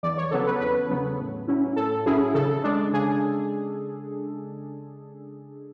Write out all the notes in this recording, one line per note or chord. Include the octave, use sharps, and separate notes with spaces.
E2 D5
C#5
C#3 F#3 B3 A4
B4
E2 B4
C#3 F#3 B3
A2
F#3 C#4 E4
A2 A4
F#3 C#4 E4 G#4
C#3 A4
G#3 D4
C#3 G#4